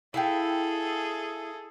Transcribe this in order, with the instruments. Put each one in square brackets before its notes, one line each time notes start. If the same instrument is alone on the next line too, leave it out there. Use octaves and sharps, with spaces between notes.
[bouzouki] E4 F5 G5 [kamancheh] G#4 A4